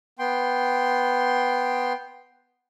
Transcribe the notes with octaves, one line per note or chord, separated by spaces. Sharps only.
B3 G5 C6